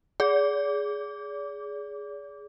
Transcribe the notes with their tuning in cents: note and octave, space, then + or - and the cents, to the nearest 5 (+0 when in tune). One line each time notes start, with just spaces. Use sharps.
G#4 +0 D5 -40